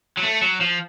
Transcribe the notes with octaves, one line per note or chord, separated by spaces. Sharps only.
F#3
A3
F#3
F3